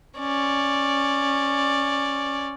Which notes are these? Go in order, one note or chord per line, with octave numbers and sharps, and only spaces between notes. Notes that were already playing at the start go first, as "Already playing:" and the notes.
C#4 D5